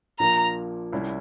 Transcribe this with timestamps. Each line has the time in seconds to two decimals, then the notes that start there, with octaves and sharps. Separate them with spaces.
0.19 A#1 A#2 F3 A#3 A#5
0.92 C2 C3 G3 C#4 E4